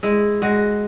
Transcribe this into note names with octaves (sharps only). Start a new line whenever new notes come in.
G#3 E4
G#3 F#4